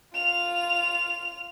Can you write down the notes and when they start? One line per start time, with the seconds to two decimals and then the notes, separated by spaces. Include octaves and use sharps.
0.14 F4 F7